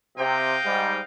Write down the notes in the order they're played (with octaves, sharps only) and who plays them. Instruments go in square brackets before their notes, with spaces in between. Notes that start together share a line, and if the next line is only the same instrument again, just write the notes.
[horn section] C3 [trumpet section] D#5 F5 G5
[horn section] G#2 G3